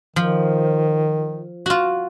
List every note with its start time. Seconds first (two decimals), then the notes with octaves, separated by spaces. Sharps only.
0.16 D#3 F3
1.66 F4 F#4